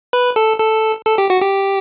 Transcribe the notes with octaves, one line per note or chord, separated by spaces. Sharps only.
B4
A4
A4
A4
G4
F#4
G4